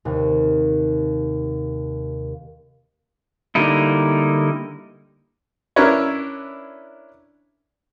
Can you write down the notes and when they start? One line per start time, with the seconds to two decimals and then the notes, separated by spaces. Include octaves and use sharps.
0.05 D#2 C3
3.55 D3 G3 A#3 D#4 E4
5.76 C#4 D4 E4 A#4 B4 C#5